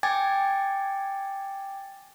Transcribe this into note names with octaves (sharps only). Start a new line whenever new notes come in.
G5 G#5 D6 G#6 A6